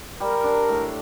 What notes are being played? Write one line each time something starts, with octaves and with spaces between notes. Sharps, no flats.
G3 A#4
D4
A2